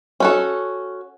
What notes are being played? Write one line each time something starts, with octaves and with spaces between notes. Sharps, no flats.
C#4 F#4 A4